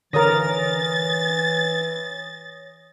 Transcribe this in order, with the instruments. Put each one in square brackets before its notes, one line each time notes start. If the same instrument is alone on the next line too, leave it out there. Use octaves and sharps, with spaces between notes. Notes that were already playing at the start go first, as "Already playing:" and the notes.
[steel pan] D3 A#4 [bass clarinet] E3 [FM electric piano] C#5 D#6 A#6 [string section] A6